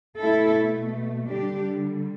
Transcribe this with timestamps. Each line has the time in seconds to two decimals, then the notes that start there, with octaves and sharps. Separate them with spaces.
0.19 B2 A3 E4 A4
1.28 D3 G3 D4 G4